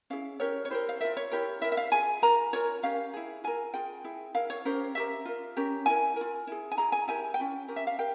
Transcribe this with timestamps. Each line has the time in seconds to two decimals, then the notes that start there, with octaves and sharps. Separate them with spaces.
0.10 C#4 E4 G#4 F5
0.40 C#4 G4 A#4 C#5
0.65 C#5
0.70 E4 G4 A#4 C5
0.89 F5
1.01 F4 A#4 E5
1.17 C#5
1.31 E4 G4 A#4
1.62 E4 E5
1.64 A#4
1.72 E5
1.77 F5
1.92 F4 G#4 G#5
2.22 F4 A#4 A#5
2.53 F4 A#4 C#5
2.83 C#4 G4 A#4 F5
3.13 E4 G#4
3.44 F4 A#4 G#5
3.74 F4 G#4 G5
4.04 E4 G#4
4.35 E4 A#4 F5
4.50 C#5
4.65 C#4 G4 A#4 C5
4.95 C#4 G4 A#4 E5
5.25 F4 A#4
5.57 C#4 G4 A#4
5.86 E4 A#4 G#5
6.16 F4 A#4
6.47 E4 G#4
6.72 G#5
6.77 E4 G#4 A#5
6.92 G#5
7.08 E4 G4 A#4 G#5
7.34 G5
7.40 C#4 F4
7.68 C#4 G4 A#4
7.76 E5
7.87 F5
7.98 G4 A#4 G5